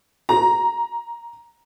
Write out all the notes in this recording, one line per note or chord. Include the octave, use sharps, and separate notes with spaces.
A#5